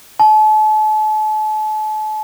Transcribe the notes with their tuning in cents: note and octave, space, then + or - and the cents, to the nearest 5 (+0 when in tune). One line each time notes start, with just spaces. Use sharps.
A5 -40